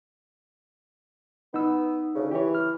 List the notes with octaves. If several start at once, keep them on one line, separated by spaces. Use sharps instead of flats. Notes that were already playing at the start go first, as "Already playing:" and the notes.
B3 D#4 E6
D2 C#3
E3 G4 C#5
F6